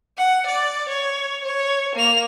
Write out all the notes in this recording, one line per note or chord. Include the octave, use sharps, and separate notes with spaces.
F#5
D5
C#5
C#5
A#3 F7